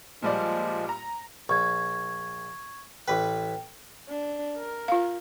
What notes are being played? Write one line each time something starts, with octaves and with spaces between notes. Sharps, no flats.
A#2 F3 G3 G#3 D5
A#5
A#1 C#6 G#6
A1 B4 G5
D4
A#4
F4 F5